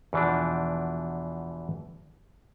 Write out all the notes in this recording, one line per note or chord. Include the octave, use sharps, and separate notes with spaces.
E2 B2 E3 F3 D4